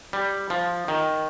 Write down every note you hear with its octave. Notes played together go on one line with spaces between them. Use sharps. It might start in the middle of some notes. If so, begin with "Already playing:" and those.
G3
F3
D#3